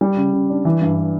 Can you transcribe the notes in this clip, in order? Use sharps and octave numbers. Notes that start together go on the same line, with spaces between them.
G3
C#3
C#3
D4
E3
G2